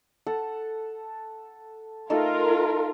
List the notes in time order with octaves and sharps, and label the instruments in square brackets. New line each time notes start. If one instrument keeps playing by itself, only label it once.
[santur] A4 F#5
[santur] A3 D#4 A4 [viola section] F4 A#4